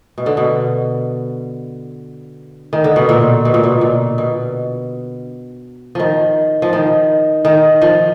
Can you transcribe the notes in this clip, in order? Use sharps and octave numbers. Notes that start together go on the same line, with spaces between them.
B2
D3
B2
D#3
D3
B2
A#2
B2
A#2
B2
A#2
B2
D#3 F3
F3
D#3
D#3
F3